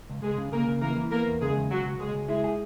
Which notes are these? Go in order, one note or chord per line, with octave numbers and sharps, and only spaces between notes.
C#2
C#2 G#3 G#4
C#3
C#3 A#3 A#4
C#3
E3 A#3 A#4
E3
A#3 B3 A#4
E2
C#3 G#3 G#4
E2
C#2 F#3 F#4
C#2
C#2 G#3 G#4
C#2
G#3 E4 G#4
G#4